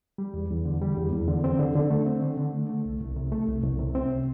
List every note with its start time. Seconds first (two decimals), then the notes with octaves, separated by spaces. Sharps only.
0.18 G3
0.34 E2
0.50 E2
0.65 D3
0.82 G3
0.97 E2
1.13 E2
1.28 D3
1.44 C4
1.59 D3
1.75 D3
1.90 A3
2.06 C4
2.22 D3
2.37 D3
2.53 A3
2.69 A3
2.86 C2
3.01 C2
3.16 C3
3.32 A3
3.48 C2
3.63 C2
3.79 C3
3.95 C4